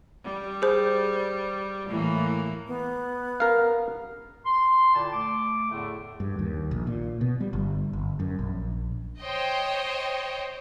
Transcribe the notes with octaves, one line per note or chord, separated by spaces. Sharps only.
G3
G#4 C5
A2 E3 A#3
B3
A#4 F5
C6
A#2 D3 E4 D5 G5 A5
A3 D6
E2 A2 D3 A3
G2
D#2
A#1
A#2
B2
G3
G1
G1
F#2
A#1
C5 C#5 D#5 G5